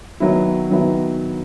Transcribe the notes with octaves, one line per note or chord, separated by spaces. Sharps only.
D#3 F#3 B3 E4
D#3 F#3 B3 E4